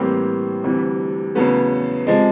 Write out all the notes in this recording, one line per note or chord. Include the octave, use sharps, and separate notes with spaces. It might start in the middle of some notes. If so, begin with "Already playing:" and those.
Already playing: A2 E3 G3 A#3 C4
D2 C3 E3 G3
E2 C#3 F#3 A3 B3
C3 F3 G#3